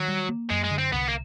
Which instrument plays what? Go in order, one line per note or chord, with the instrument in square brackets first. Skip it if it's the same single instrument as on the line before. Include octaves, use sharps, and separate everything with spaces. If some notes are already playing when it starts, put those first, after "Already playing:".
Already playing: [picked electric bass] D#3 [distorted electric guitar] F#3
[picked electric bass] G3
A#3
[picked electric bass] F#2 [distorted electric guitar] G#3
[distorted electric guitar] G#3
[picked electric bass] D3
[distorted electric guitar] C4
[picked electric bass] C2 [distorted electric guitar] B3
[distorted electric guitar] A#3